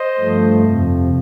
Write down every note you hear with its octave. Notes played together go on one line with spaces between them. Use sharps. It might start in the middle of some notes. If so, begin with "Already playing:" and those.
Already playing: C5 D#5
G2 F3 A3
F2 C3 F3